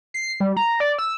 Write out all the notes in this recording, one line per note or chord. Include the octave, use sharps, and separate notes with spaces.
C7
G3
A#5
D5
E6